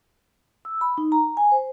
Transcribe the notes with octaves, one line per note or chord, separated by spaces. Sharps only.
E6
B5
D#4
A#5
G#5
C5